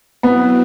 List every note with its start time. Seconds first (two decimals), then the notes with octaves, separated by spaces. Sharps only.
0.23 F#3 B3 C4 E4 B4